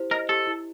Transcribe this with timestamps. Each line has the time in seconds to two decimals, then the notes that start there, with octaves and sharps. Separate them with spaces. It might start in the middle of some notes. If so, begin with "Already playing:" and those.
Already playing: E4 G4 C5
0.11 A#4 D#5
0.29 G4 A4
0.47 E4